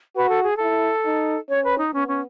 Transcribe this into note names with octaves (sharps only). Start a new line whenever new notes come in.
F#4 B4
A4
G#4
E4 A4
D#4
C#4 C#5
B4
D#4
B3 C#4
C#4